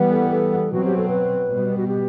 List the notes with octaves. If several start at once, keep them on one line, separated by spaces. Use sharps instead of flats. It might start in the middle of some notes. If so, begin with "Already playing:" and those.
Already playing: E3 G3 B3
A4
A4
B2 F#3 C4 F#4
G4
A4
B4
B2 G3 B3
F#4
G4